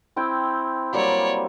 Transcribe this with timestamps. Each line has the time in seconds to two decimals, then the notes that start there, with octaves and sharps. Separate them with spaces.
0.16 C4 E4 G5
0.93 F#3 G3 A#3 C#5 D5